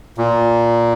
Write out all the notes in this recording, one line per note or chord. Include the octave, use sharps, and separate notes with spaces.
A#2